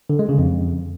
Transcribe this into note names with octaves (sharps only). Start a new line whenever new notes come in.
D3
G#3
C#3
F2